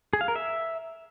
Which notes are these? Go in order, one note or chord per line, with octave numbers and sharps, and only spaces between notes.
G#4
F5
A#4
E5